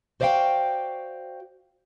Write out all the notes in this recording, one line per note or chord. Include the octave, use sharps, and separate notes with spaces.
F#4 C5 D5 D#5 F5 G5